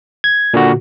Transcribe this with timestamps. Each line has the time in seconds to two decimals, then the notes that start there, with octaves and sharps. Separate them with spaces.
0.24 G#6
0.54 A#2 D3 F#4